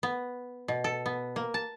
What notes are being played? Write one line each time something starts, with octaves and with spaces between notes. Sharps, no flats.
B3
B2
A4
B3
A#3
A5